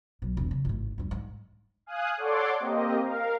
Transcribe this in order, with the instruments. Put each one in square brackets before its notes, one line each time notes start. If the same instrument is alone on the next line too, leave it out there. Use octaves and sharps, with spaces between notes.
[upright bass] B1
E1
C#3
G#1 A2
E2 G2
G#2
[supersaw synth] F5 G#5 D#6 F#6
A4 C#5 D5 F#5 C6 D6
A#3 C4 G4 D#5
A#4 F5